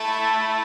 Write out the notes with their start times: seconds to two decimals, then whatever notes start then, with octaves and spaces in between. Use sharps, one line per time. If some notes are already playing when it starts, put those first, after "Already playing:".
Already playing: A3 E4 A4 E5